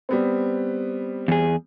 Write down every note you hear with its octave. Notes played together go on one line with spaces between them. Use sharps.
G3 B3 C4
E2 G#4